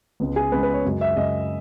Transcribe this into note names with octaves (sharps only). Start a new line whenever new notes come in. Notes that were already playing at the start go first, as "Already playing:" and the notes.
C#2 C#3 G#3 B3
G#4
C#2 C#3 G#3 B3 B4
B4
C#5
F#2 C#3 G#3
E5
F#2 C#3 G#3 D#5